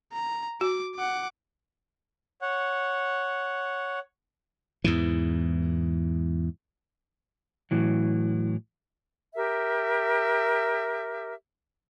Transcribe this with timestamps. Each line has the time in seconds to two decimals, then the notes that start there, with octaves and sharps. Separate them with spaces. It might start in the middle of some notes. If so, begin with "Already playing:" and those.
0.13 A#5
0.61 F#4 D6
0.95 F#5 D6
2.42 C#5 F#5
4.84 E2 G#2 E3
7.71 A2 E3 F#3
9.35 G4 A#4 E5